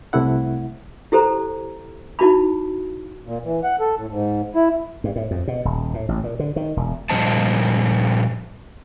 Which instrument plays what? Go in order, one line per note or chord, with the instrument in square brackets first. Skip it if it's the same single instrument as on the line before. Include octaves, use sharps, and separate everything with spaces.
[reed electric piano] C2 C3 A3 E4 F#5
[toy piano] E4 G4 A4 C5 A#5
D#4 E4 F#4 A5 B5
[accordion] A#2
E3
F#5
A4
A2
G#2
E4
[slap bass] G2
A2
F2
B2
D#1
A2
A1
A#2
D3
D#3
E1
[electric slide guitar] A#2 F3 G3 C5 D#5 A5